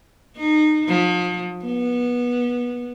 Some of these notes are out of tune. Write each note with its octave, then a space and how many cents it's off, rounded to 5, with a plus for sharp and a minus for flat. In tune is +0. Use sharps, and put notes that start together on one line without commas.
D#4 -25
F3 +35
B3 -20